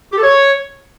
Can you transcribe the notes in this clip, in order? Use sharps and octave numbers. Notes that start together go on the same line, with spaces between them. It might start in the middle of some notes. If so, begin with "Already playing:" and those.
G4
A4
C#5